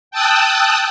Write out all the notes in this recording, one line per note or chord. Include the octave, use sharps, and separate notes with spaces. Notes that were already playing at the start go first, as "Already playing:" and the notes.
G5 A5 D#6 E6 F#6